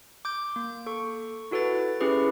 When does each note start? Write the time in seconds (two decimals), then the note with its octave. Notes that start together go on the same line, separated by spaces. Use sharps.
0.25 D6 G6
0.56 A#3
0.86 A4 C#6
1.51 E4 F#4 A4 B4 A6
2.01 C#4 E4 G4 G#4 B4